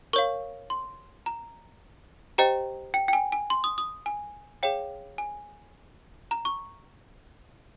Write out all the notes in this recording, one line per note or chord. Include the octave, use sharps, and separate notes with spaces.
A#4 C#5 F5 C#6
C6
A#5
G4 C5 D#5 G5 A#5
G5
G5
G#5
G#5
C6
D#6
D#6
G#5
G#4 C#5 F5 G5
G#5
A#5
C#6